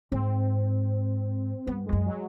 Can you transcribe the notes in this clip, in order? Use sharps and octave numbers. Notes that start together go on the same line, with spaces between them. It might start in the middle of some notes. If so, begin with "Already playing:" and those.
G#2 C4
G2 B3
G#3
F2
F#2
F#3